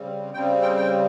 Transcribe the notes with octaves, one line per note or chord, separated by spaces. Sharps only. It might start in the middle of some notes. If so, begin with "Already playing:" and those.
Already playing: C#3 G3 C4
C#3 G3 C4 G5
G5
G5